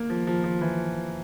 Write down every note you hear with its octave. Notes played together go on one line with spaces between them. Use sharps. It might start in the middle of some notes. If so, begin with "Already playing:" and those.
Already playing: A#3
F3
F3
F3
E3